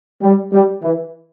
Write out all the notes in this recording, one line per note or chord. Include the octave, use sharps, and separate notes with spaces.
G3
G3
E3